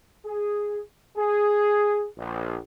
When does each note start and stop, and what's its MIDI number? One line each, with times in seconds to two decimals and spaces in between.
0.26 0.81 68
1.17 2.07 68
2.18 2.58 34